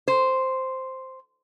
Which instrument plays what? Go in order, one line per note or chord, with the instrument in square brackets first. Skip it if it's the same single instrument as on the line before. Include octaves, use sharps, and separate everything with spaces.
[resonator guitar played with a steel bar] C5